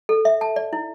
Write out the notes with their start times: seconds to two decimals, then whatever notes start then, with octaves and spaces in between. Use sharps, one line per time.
0.09 A4
0.25 E5
0.41 A5
0.56 D5
0.73 E4